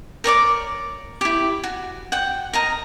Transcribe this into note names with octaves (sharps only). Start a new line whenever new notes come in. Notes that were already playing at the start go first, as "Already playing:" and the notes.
A#4 C#5 D5 D6
E4 G4
F#4
F#5 G5
A#4 D#5 A#5